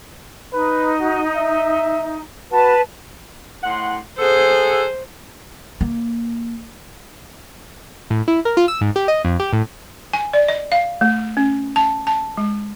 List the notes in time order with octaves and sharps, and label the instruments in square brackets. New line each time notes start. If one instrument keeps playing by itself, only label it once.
[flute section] D#4 [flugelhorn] B4
[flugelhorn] F#4
E5
[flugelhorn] F#4 [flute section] B4 A5
[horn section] A2 F#5 C6
[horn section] G#4 A4 F#5 [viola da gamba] C5
[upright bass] A#3
[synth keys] A2
E4
A#4
F4
E6
G#2
G4
D#5
F2
G4
A2
[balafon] G#5
D5
D#5
F5
A3
C#4
A5
A5
G#3